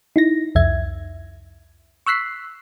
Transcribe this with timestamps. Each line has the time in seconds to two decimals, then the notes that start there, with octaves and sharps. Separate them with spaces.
0.16 D#4 E4 A#6
0.55 C2 F2 E5 G#6
2.06 C#6 E6 F#6 B6 C7